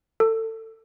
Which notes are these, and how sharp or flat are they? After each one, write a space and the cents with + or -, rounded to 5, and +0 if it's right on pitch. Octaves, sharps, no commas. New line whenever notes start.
A4 +25